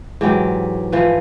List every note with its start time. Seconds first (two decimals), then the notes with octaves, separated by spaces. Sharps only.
0.21 G#2 E3 F#3 G4
0.92 E3 F3 B4